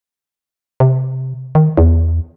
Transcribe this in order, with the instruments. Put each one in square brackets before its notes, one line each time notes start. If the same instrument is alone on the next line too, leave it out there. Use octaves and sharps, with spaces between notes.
[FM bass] C3
D#3
E2